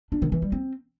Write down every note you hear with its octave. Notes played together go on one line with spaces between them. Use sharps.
D4
D#3
E3
G3
C4